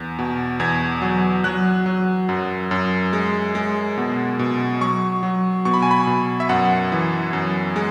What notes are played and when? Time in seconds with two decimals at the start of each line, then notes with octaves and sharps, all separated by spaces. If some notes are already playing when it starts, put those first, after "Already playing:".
Already playing: E2
0.19 B2
0.60 E2 G#6
1.02 F#3
1.44 F#3 F#6
1.86 F#3
2.29 F#2
2.71 F#2
3.13 G#3
3.55 G#3
3.97 B2
4.39 B2
4.81 F#3 C#6
5.23 F#3
5.65 B2 C#6
5.74 B5
5.82 G#5
5.91 B5
6.07 B2
6.40 E5
6.49 F#2 F#5
6.92 E3
7.33 F#2
7.76 G#3